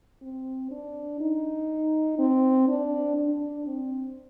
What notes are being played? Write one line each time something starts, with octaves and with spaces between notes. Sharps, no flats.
C4
D4
D#4
C4
D4
D4
C4